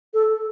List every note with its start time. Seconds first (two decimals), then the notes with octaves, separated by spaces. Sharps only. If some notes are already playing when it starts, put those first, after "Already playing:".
0.14 A4